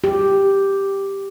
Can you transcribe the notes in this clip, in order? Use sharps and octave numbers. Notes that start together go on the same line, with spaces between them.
G4